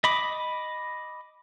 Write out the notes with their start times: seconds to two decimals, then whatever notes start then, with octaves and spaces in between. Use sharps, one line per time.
0.04 D#5 B5 D6